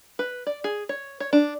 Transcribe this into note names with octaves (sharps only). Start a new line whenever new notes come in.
B4
D5
G#4
C#5
C#5
D4